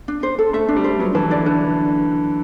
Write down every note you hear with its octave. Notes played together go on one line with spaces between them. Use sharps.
D4
C5
A4
A3 E5
D4
G3
C5
F#3 B4
E3 A5
D3 D5
D3 B4